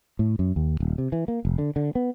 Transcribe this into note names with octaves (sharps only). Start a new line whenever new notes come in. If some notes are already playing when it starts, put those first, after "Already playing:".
A2
F#2
D#2
D#1
C3
E3
A#3
F1
D3
D3
B3